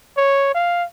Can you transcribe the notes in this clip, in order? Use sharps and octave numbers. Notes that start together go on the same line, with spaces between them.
C#5
F5